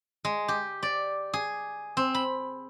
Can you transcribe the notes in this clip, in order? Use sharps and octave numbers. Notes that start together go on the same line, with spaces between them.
G#3
G4
D5
G#4
C4
B5